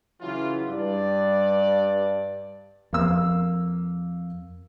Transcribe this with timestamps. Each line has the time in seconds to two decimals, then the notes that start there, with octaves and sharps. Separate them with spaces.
0.21 C#3 E3 F#3 E4 F4
0.68 G2 D5
2.93 F2 A#3 E6